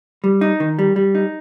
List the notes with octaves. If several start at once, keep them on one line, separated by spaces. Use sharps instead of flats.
G3
D#4
D#3
G3
G3
D#4